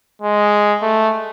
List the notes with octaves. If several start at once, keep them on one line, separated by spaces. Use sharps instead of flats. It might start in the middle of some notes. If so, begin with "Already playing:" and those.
G#3
A3